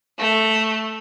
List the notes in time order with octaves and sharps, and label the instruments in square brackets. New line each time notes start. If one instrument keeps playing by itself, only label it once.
[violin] A3